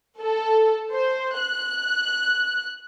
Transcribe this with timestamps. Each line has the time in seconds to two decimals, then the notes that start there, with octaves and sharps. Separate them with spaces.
0.20 A4
0.93 C5
1.41 F#6